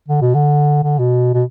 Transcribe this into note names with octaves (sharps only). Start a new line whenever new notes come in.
D3
B2
D3
D3
B2
B2